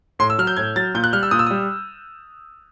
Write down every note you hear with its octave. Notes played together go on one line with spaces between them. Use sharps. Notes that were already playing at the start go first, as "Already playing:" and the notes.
A2 C6
E6
F#3 F6
G6
A2 G#6
F#3 A6
A#2 G6
F#6
G3 F6
E6
A#2 D#6
E6
D#6
G3